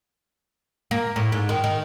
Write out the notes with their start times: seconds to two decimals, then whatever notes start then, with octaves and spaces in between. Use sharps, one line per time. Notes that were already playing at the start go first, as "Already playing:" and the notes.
0.91 A#3
1.16 A2
1.32 G#2
1.49 D#3
1.64 D#3